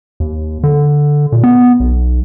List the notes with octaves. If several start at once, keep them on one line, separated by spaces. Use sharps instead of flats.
D#2
D3
A#2
B3
B1